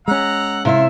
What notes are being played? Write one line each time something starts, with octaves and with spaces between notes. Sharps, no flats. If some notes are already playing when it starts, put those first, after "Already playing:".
G#3 C#4 F#5 A#5 E6
C3 E4 F4 E5